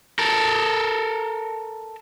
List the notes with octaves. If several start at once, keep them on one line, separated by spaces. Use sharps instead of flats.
A4 A#4